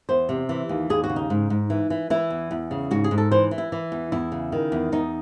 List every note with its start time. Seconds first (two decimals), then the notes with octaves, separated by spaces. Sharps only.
0.09 E2 C5
0.29 C3
0.49 E3
0.69 D#2
0.90 D#2 G#4
1.04 F#4
1.09 C#3
1.16 D#4
1.30 G#2
1.50 G#2
1.70 E3
1.90 E3
2.10 E3 E4
2.30 E2
2.51 E2
2.71 C#3
2.91 G#2 F#4
3.04 G#4
3.11 G#2
3.18 A4
3.31 E3 C5
3.51 E3
3.58 E4
3.72 E3
3.92 E2
4.12 E2 E4
4.32 C#3
4.52 D#3
4.72 E2
4.92 E2 D#4